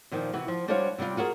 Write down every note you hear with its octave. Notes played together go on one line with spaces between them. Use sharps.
A#2 D#3 F3
C3 E3 F#4
F3
G3 D4 F#4 C5 C#5 F5
C3 G3 D4 F4
F4 F#4 G#4 A#4